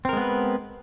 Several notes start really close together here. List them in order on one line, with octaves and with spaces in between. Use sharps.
C4 A#4 G#3 B3 B4